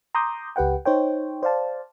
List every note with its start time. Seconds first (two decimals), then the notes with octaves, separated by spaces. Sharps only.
0.15 A#5 C6 D6 D#6 G6
0.56 C#2 G4 B4 F#5 G5
0.85 D#4 C5 C#5 G5
1.43 C5 D5 F5 A5